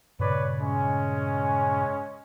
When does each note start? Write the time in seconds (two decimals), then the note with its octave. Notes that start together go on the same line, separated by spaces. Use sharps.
0.19 G2 A#2 C#3 B4 C#5 D5
0.60 G#3 C#4